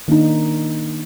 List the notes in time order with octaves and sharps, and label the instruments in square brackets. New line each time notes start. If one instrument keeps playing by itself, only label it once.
[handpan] D#3 A#3 D4 D#4